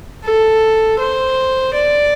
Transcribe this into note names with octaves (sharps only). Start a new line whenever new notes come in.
A4
C5
D5